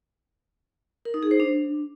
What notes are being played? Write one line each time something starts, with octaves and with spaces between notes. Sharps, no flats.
A#4
D#4
G#4
C5
D4